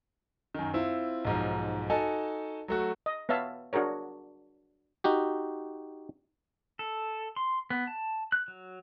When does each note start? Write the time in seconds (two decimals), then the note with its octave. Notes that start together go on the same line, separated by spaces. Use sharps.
0.55 F#2 D#3
0.74 C4 E4 F4
1.25 B1 G#2 F3
1.90 D#4 F#4 A4 G#5 A5
2.68 F#3 A3 F#4
3.06 D#5
3.29 B3 C#5 E5 F5 A5
3.73 D4 F#4 G#4 A#4 C#5
5.04 D#4 F#4 G4
6.79 A4
7.36 C6
7.70 B3
7.87 A5
8.32 F#6
8.48 F#3